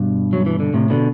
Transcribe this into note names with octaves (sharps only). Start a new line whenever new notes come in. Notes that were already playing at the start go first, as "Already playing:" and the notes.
Already playing: G2 B2
F#3
E3
D3
A2 C3
B2 D3